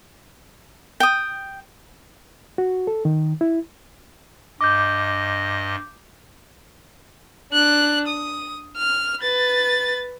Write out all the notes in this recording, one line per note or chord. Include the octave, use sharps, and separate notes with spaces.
G5 D#6
F#4
A4
D#3
E4
G2 D#5 D6 G6
D4 F#6
D#6
F6
B4 A6